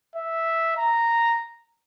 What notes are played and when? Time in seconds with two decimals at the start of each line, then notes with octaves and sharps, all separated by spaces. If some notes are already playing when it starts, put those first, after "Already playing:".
0.16 E5
0.77 A#5